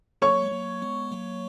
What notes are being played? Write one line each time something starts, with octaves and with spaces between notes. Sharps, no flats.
F#3 A#3 C#5 C#6
G#3
F#3 A#3
G#3 B3
F#3 A#3